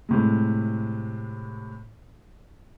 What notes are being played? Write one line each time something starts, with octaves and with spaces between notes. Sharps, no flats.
A2 C3 G#3